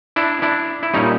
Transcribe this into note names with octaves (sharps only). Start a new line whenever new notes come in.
D4 E4
D4 E4
E4
A#2 G3 C#4 D#4